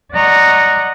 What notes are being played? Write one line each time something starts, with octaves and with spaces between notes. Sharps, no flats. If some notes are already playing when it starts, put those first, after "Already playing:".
D5 D#5 F#5 A#5 C#6